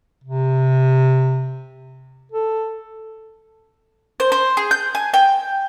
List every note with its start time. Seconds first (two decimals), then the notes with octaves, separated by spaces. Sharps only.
0.24 C3
2.32 A4
4.20 C5
4.32 C5
4.57 G#4
4.71 G6
4.95 G#5
5.14 G5